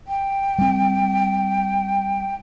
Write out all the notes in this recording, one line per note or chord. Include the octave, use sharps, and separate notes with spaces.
G5
G3 C4